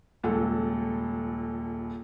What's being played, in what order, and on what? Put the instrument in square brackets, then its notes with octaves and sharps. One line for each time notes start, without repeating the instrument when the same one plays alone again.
[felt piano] D#1 C#2 A4